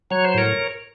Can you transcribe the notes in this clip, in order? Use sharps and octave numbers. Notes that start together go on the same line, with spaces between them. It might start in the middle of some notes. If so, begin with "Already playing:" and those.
F#3 C#5
C5
A2 A#4 C#5